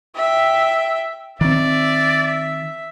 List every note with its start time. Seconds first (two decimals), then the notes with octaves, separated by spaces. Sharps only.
0.16 E5 G5
1.41 D#3 C4 D5 E5